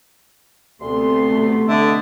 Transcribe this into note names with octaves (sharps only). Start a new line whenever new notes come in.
D2 C3 A3 B3 C6
D3 D#5 E5